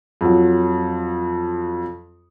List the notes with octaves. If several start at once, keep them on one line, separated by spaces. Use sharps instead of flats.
F2 F#3